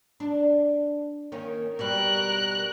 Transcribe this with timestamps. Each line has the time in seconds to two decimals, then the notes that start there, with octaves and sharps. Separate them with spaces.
0.20 D4
1.32 D#3 A#3 C#4
1.79 B2 G3 A#4 F#6